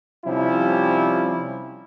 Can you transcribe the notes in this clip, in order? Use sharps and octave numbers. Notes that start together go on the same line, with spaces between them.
C3 F3 G3 C#4 E4